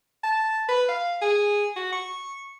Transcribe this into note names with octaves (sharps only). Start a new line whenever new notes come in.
A5
B4
F5
G#4
F#4
C#6